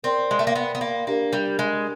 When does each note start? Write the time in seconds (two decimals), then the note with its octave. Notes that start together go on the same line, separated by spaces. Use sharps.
0.03 C4 A#4 D5 G5 C6
0.31 G#3
0.39 A3
0.47 A#3
0.55 B3
0.75 B3
0.81 A#3
1.07 A#3 D4 G4 A#4 D5
1.33 G3
1.59 G#3